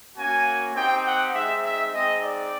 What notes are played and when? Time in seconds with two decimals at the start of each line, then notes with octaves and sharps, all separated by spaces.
0.16 A#3 C#4 F#4 G#5
0.75 C4 D#4 G4 G5
1.05 F#5
1.33 G#3 C4 D#4 E5
1.63 E5
1.92 G#3 C4 D#4 D#5
2.22 D5